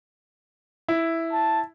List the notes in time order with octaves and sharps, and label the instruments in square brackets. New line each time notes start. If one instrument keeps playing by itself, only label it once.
[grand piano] E4
[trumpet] A5